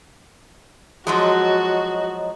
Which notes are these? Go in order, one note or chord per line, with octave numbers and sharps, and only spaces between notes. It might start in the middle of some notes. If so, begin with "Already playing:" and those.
F3 F#3 G#3 F#4 C#5 D#5 A#5